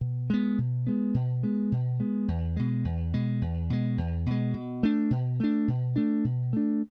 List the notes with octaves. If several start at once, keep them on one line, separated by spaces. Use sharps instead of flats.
B2
G#3 B3
B2
G#3 B3
B2
G#3 B3
B2
G#3 B3
E2
B2 G#3
E2
B2 G#3
E2
B2 G#3
E2
B2 G#3
B2
A3 D4
B2
A3 D4
B2
A3 D4
B2
A3 D4